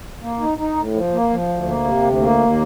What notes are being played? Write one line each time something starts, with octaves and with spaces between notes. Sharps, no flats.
A#3
D#4
D#4
A2
F3
A#3
F3
D2
A#3
C3
D2
A#3
D#2